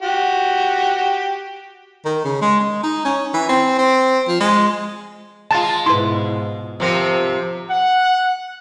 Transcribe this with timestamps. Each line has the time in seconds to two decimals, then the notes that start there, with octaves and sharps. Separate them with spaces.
0.02 F#4 G4
2.05 D#3
2.24 C#3
2.42 G#3
2.60 G#3
2.84 D#4
3.05 C#4
3.34 E3
3.49 C4
3.78 C4
4.28 F3
4.40 G#3
5.51 G#3 F4 A5 A6
5.86 G#2 B2 E4 B4 C6
6.80 C3 F3 C4 A#4
7.68 F#5